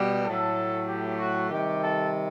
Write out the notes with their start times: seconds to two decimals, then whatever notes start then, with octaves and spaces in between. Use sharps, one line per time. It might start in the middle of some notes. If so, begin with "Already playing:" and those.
Already playing: B2 G3
0.25 A2 F#3 A4
0.88 G4
1.19 F#4
1.49 C3 D#3 G3 G4
1.81 A4